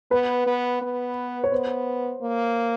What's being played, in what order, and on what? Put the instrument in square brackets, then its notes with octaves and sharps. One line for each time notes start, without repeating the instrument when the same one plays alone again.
[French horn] B3 [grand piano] B4
[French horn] B3
B3
[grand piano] C#5
[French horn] B3 [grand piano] C5
[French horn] A#3